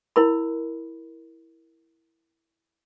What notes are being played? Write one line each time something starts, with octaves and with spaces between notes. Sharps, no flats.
E4 A#4 B5